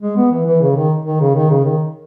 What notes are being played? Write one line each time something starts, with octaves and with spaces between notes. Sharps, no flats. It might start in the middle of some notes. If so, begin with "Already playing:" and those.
G#3
B3
E3
E3
C#3
D#3
D#3
C#3
D#3
C#3
D#3